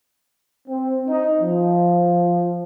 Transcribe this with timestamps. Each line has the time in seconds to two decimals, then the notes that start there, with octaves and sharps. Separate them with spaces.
0.69 C4
1.08 D#4
1.41 F3